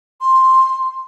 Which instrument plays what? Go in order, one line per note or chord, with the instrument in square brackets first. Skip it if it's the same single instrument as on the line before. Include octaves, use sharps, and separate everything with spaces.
[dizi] C6